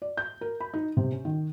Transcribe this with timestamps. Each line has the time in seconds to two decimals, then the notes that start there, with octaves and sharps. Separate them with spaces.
0.02 D5
0.17 G6
0.41 A#4
0.60 B5
0.74 D#4
0.97 C3
1.12 C#4
1.25 D#3